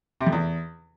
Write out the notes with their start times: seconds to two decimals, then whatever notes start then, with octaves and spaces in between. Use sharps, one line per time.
0.21 C3
0.26 F2
0.32 E2